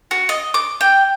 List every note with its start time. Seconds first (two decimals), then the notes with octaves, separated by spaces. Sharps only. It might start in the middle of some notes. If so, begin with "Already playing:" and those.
0.11 F#4
0.29 D#5
0.54 D6
0.81 G5